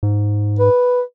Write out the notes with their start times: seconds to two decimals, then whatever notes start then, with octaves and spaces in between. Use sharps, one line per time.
0.03 G#2
0.59 B4